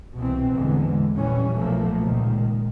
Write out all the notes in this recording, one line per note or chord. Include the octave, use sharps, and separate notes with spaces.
C2 B2 E3 C4
A1 E2 D3 E3 G#3
A#1 E3 G3 C#4
B1 A#2 F3 A3 A#3
C#2 A#2 D#3